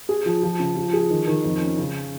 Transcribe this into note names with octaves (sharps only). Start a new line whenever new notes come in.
G#4
F3
F3
C#3
F3
G#4
D#3
D#3
F2
C#4
C#3